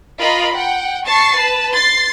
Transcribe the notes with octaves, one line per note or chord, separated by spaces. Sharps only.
F4 A#4 D#5 B5
F#5 G5
A5 C#6 A6 C7
B4 A5
C6 A6 C7